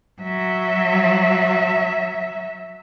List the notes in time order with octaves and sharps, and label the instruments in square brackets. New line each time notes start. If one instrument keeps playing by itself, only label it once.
[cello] F#3 E5